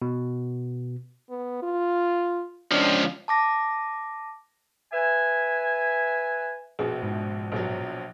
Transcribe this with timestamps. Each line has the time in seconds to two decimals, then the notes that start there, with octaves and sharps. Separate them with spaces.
0.02 B2
1.30 B3
1.63 F4
2.71 C#2 F3 D4
3.28 A5 D6 A#6
4.93 B4 E5 G#5
6.79 A#1 B2 G#4
7.03 G#2
7.52 A#1 B2 F#3